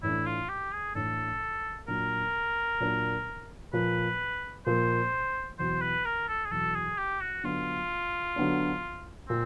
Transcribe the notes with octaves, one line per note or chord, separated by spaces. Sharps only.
A2 E3 A3 D4 E4
F4
G4
G#4
A2 E3 A3 D4 A4
A#2 F#3 A#3 D4 A#4
A#2 F#3 A#3 D4
A#2 F3 A#3 B4
A#2 F3 A#3 C5
E2 B2 F#3 C5
B4
A#4
A4
G#4
E2 B2 F#3 A4
G#4
G4
F#4
D3 F#3 B3 D4 F4
D3 F#3 B3 D4
A#2 C4